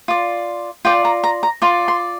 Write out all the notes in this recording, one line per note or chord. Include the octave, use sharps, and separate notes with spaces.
F4 D5
F4 D5 G5
A#5
A#5
A#5
F4 D5 C6
C6